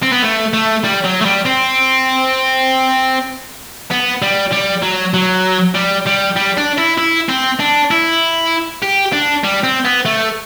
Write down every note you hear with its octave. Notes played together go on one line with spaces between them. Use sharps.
C4
B3
A3
A3
G3
F#3
A3
G3
C4
B3
G3
G3
F#3
F#3
G3
G3
G3
D4
E4
E4
C4
D4
E4
G4
D4
G3
C4
B3
A3